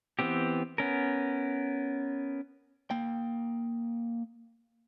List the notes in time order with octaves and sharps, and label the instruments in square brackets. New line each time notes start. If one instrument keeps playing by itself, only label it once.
[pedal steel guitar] E3 B3 C4 G4
B3 C#4 A#4
[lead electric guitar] A#3 G5